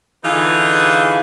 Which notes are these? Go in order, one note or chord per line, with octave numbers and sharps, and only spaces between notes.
D3 E3 D#4 F4 G#4 B4